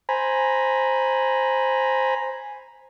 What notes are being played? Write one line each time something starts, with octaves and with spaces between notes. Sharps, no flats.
C5 G#5 A#5 B5